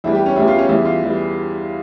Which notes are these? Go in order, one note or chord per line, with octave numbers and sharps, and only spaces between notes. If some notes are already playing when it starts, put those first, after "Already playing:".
E2 E3 G3 E4
G4
C#4
E2 E3 G3 E4
F4
C#4
E2 E3 G3 E4
F4
E3 G3